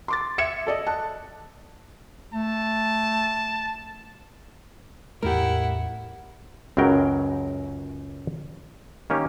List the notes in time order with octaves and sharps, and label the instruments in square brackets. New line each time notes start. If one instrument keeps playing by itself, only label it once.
[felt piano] C6 D6 A6
E5 G#6 C#7 E7
A4 D5 D#5
A5 F#6
[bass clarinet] A3 [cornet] A5
[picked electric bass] A1 E2 A3 [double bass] A2 [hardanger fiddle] E4 F#5 [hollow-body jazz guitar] G4 A#4
[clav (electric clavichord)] C#2 F#2 C#3 F#3 A#4 G5
D#3 A#3 C#4 G4